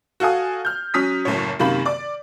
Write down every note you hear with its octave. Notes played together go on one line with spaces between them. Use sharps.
F#4 A4 F5 G#5 D#6
F6 G6
F#3 C#4 D#6 B6
F#1 F#2 A2 C#5
F#2 C3 D#3 A#3 B5
D5 D6